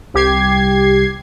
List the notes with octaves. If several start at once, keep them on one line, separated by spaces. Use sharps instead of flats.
C2 G4 G#6 C7